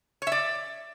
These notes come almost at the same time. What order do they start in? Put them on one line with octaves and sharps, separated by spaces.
C#5 E5 D5